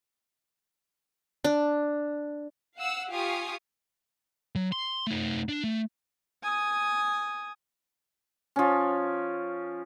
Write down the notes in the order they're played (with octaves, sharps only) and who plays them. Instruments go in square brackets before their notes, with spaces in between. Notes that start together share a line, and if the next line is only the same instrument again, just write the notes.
[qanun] D4
[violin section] F5 F#5 E6
F4 G4 F5 G#5 C#6 D#6
[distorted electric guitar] F#3
C6
A3 D#4
D4
A3
[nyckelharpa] G#5 D#6
[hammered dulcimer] F3 C#4